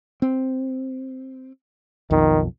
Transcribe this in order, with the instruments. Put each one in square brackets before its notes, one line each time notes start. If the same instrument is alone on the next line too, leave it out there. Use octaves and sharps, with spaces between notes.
[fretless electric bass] C4
[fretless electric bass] B1 F2 [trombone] D#3